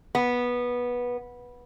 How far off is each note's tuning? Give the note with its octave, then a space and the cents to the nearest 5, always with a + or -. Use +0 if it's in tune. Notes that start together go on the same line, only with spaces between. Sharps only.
B3 -15